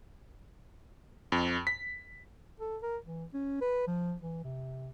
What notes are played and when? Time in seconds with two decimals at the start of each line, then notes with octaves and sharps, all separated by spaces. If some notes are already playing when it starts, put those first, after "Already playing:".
1.32 F2
1.67 B6
2.60 A4
2.83 A#4
3.06 E3
3.34 C#4
3.61 B4
3.87 F3
4.22 E3
4.44 C3